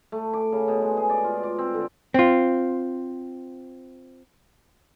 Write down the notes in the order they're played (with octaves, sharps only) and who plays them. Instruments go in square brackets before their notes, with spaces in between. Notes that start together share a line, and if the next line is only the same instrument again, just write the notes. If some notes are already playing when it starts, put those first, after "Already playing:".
[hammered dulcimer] A3
D6
C#3
B2
G#3
G#4
D5
F4
D5
C4
D3
[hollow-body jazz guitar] C4 F4